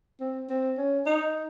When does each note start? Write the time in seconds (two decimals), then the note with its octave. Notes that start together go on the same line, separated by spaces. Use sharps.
0.20 C4
0.49 C4
0.78 C#4
1.06 D#4